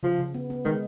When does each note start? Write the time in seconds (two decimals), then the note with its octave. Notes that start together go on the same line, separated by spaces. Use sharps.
0.03 C#3 F3
0.19 C#3
0.34 B3
0.50 B3
0.65 D#3 G#3